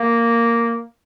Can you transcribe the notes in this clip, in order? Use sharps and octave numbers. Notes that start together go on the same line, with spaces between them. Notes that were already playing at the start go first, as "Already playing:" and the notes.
Already playing: A#3